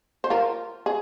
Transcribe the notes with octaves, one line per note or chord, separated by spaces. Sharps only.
C5
F4 A#4
G#4